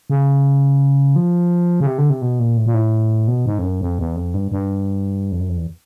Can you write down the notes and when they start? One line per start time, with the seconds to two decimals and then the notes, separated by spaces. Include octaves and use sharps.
0.10 C#3
1.16 F3
1.80 C#3
1.87 C3
1.98 D3
2.10 C3
2.22 B2
2.39 A#2
2.57 A2
2.66 A#2
2.74 A2
3.28 B2
3.46 G#2
3.59 F2
3.63 F#2
3.81 F2
3.99 E2
4.16 F2
4.34 G2
4.52 G2
5.32 F2
5.40 F#2
5.49 F2
5.57 E2